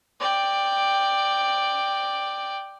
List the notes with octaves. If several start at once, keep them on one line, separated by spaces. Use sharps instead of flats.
D5 G5